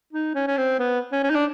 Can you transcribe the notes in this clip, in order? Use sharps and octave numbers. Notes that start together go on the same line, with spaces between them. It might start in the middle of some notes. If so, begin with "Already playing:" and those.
D#4
C#4
C#4
C4
B3
C#4
C#4
D#4
D4